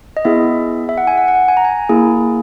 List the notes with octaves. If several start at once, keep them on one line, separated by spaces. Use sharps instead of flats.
D#5
B3 E4 G#4 E5
E5
F#5
G#5
F#5
F#5
G#5
A#5
G#5
A#3 E4 G#4